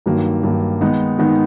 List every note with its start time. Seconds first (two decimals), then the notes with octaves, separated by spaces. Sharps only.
0.06 G2 D#3 F#3 A#3
0.43 G2 D#3 F#3 A#3
0.81 D#3 G#3 B3 D#4
1.19 D#3 G#3 B3 D#4